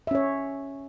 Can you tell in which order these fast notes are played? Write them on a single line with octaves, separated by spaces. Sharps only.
E5 C#4 C#5